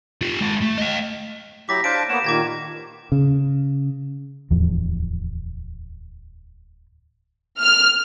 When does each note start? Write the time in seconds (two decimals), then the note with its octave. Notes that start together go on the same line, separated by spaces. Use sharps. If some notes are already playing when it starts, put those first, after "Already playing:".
0.21 F4 G4
0.41 G#3 A#4
0.62 A3
0.78 D#5 F5
1.69 F#3 E4 G4 D6 A#6 B6
1.84 D4 C5 F5 A5 D7
2.09 A#3 B3 C#5 F#5 E7
2.24 A#2 D#3 A#3 G4 D6 G#6 A#6
3.12 C#3
4.51 D1 E2 F3
7.60 F6